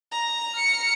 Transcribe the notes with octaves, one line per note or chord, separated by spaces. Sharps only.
A#5
F6 C#7